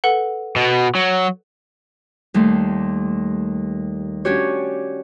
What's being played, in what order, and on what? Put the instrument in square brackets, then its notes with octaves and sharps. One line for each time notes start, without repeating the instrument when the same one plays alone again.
[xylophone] A4 B4 F#5
[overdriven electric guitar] B2
F#3
[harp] D#2 G3 A3 C6
C#4 D4 F#4 G4 C#5